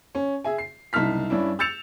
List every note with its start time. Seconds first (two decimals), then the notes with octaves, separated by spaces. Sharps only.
0.15 C#4
0.44 G#4 E5 G#5
0.58 C7
0.93 F#1 C2 D#4 A5 F6 B6
1.30 G2 C#4 D4 E4
1.59 E6 G6 A6 C#7 E7 F7